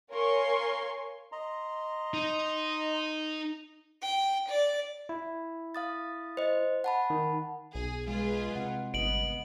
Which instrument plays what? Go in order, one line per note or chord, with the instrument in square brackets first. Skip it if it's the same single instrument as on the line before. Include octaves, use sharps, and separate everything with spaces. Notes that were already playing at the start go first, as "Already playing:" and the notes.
[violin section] A#4 C#5 F5 G#5 C6 C#6
[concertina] D#5 A#5 C6
[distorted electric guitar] D#4
[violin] G5
D5
[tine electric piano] E4
[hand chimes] F5 D#6 A6
C5 D#5
F#5 A5 B5
[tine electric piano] D#3
[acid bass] B1 [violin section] G#4
[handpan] G#3 [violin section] F4 G#4 B4
[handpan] C3 F#5
[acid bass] G1 [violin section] B3 [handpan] D#5 [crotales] D7 F#7